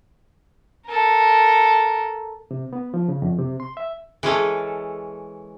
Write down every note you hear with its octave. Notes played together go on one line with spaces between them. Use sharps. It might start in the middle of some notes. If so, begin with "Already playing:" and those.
A4 A#4
C3
B3
F3
C#3
F2
C3
C6
E5
E3 G#3 C#4 A4